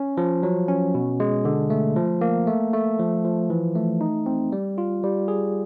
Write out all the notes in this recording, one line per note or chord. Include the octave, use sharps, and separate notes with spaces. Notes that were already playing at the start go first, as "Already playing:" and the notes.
Already playing: C#4
F3
F#3
C#4
B2
G#3
D3
A3
F3
A#3
A3
A3
F3
F3
E3
A3
D#4
C4
G3
F4
G3
G#4